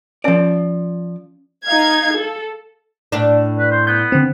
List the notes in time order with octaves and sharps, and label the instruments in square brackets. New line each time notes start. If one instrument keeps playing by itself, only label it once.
[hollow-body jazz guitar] F3 D5 [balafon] C#4 C#5
[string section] D#4 F5 G#6
A4
[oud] A2 D4
[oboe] B4
C5
[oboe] B3 [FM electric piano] G6
[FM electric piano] D3 C4